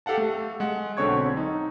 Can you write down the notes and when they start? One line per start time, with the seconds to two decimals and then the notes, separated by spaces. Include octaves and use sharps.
0.06 G4 A4 F5 F#5 A5
0.18 A3
0.60 G#3 F#5
0.97 B1 D3 C4 C#5 C#6 G#6
1.37 D#4